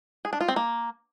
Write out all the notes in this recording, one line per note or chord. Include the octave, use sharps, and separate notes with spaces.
G#4
D4
F4
C4
A#3